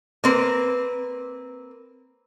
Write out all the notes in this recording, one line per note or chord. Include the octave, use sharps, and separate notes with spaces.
A#3 C4 B4